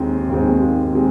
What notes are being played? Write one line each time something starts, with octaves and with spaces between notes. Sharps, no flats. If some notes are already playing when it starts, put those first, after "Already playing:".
Already playing: D#2 D#3 G#3 C4
D#2 D#3 G#3 C4
D#3 G#3 C4